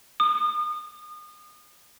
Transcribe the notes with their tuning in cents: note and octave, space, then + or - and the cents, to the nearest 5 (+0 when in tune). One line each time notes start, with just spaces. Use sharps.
D#6 -35